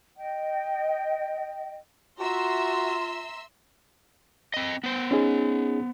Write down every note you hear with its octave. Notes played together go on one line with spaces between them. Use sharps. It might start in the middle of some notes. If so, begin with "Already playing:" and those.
D#5 G5
F4 F#4 E5 A#5 C6 E6
C4 D#5
B3 C5
C#4 D#4 G#4